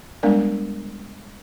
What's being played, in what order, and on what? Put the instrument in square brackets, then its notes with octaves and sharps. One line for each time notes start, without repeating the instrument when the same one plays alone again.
[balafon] G3 G#3 B3 D4 A#4 D5